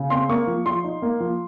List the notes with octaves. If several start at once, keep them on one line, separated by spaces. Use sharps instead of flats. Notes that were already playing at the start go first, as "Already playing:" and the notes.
Already playing: C#3
C4 C6
A#3 C#6
F3
F3 C6
D#4
A#3
F3